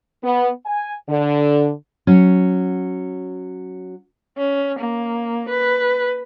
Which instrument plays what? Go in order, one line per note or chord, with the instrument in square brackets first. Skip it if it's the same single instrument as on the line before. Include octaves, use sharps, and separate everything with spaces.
[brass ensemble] B3
G#5
D3
[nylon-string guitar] F#3 C#4
[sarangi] C#4
A#3
B4